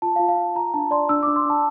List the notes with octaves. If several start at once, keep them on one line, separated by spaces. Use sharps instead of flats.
F4 A5
F4 F5
F5
F4
F4 A#5
D4 A5
D5 C6
D4 E6
D4 D6
C6
D4 A5